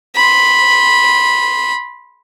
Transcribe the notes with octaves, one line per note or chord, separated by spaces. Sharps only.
B5 C6